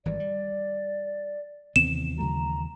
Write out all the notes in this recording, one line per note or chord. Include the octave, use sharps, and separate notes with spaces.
G#1 E3 G3 D5
G3
D#2 C3 E3 B3 C4 E7
C#3 F#3 A3 A#5